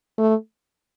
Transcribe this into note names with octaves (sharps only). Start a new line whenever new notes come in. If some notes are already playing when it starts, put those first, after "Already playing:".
A3